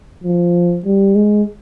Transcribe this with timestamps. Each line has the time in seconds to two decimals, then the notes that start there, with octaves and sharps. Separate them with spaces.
0.23 F3
0.86 G3
1.15 G#3